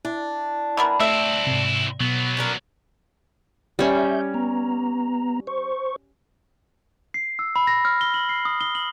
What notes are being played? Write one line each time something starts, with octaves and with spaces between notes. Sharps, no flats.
D4 E4
E3 B3 A#4
A3 C4 E4 E5
G#2 C3
B2 F#3 B3
C#4 D4 A#4
G3 C#4 E5 G6
B3 A#5
C5 C#6
C7
E6
B5
A#6
F6
G7
F#7
C7
D#6
G7
F#7